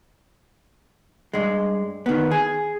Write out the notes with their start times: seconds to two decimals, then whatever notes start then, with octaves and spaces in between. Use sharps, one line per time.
1.34 G2 G#3
2.06 D#3 B3
2.31 G#4